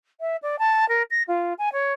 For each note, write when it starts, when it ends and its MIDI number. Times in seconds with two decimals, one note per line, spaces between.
0.20 0.36 76
0.42 0.56 74
0.59 0.87 81
0.89 1.02 70
1.11 1.23 94
1.28 1.53 65
1.58 1.69 80
1.72 1.93 73